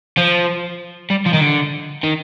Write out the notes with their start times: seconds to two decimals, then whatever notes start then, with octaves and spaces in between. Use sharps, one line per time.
0.17 F3
1.11 G3
1.26 F3
1.34 D#3
1.41 D3
2.03 D#3